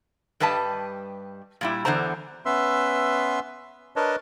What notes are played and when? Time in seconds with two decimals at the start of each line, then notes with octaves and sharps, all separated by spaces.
0.40 G2 G3 B4 D#5 A5
1.61 A#2 G3 E4
1.85 E2 D3 G3 C5 A#5
2.46 B3 C#4 B4 E5 C6 E6
3.96 D4 A#4 B4 C#5 D#5 A5